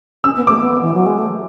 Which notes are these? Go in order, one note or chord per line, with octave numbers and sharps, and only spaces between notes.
C#4 E6
B3
A3 D6
B3
E3
F#3
G#3
A3